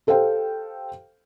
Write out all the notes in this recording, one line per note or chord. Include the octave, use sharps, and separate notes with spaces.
G4 A4 C5 F5 G5